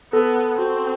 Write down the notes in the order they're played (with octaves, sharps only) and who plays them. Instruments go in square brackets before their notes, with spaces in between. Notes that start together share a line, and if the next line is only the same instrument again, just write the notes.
[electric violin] B3 [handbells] A4
[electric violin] C4 [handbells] F#4